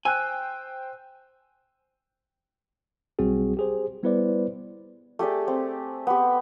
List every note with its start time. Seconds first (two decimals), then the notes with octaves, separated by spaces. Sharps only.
0.05 C5 G5 G#5 E6 F#6
3.19 B1 G3 C4 F#4 G#4
3.57 G4 G#4 C5
4.03 G3 B3 E4 B4 C5 D5
5.19 A3 G4 G#4 D5
5.48 C4
6.07 B3 G4